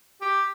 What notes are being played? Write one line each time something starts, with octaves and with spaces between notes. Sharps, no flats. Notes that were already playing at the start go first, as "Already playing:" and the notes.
G4